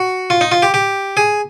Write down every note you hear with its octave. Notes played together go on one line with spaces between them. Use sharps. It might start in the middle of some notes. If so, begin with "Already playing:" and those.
Already playing: F#4
F4
D#4
F4
G4
G4
G#4